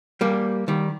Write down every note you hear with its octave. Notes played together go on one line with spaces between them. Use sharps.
G3 A#3
D#3 G3